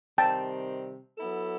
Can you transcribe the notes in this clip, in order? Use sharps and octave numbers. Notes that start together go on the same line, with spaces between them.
C3 D#3 G3 C4 G5 A5
F#3 B3 E4 A4